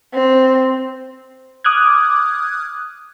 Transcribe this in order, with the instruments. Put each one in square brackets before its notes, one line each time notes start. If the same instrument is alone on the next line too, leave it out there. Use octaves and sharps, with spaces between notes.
[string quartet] C4
[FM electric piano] D6 D#6 F6 F#6 G#6